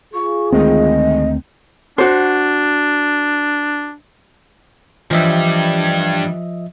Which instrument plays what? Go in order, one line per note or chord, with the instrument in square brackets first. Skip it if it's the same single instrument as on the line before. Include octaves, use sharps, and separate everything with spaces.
[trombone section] F4 G#4 [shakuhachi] C#6
[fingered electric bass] D2 A3 C4 [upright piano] D#3 G#3 [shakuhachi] D#5
[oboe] D4 [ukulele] F#4 C5
[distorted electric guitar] G2 G3 [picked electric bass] E3 [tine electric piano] F3 D#5 E5